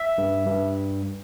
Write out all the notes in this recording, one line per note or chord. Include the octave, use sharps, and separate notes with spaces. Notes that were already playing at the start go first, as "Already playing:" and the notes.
Already playing: E5
G2
G2